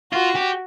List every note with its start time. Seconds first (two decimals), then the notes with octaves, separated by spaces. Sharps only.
0.13 F4 F#4
0.36 G4